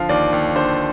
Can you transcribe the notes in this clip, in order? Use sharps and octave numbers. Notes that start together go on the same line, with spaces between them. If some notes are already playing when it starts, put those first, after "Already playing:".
Already playing: D3 F3 F5
D#2 D5
D#2
D3 C5